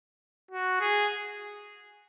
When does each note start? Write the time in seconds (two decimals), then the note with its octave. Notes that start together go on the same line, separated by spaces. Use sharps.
0.51 F#4
0.80 G#4